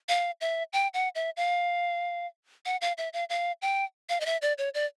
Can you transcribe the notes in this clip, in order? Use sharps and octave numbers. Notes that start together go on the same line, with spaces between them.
F5
E5
G5
F#5
E5
F5
F#5
F5
E5
F5
F5
G5
F5
D#5
E5
D5
C#5
D5